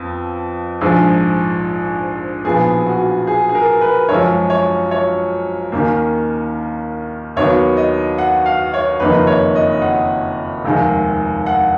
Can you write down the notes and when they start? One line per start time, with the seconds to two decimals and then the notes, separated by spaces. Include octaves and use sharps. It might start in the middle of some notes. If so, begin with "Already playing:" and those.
Already playing: F2 F3 B3
0.81 A#1 G#2 F3 G#4
2.45 B1 A#2 F3 B3 G#4
2.86 F#4
3.27 G#4
3.49 G#4
3.55 A#4
3.81 B4
4.09 G#1 F#2 F3 G#3 C#5
4.50 C#5
4.91 C#5
5.72 D#2 D#3 A#3 C#4
7.36 D#2 D#3 F#3 B3 C#5
7.77 D#5
8.18 F#5
8.46 F5
8.74 C#5
9.00 F#1 F2 D#3 A#3 D#4 B4
9.27 C#5
9.55 D#5
9.82 F#5
10.64 F1 D#2 D#3 G#3
11.46 F#5